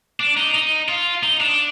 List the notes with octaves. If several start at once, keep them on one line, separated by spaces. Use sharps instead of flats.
D4
D#4
D#4
F4
D#4
D4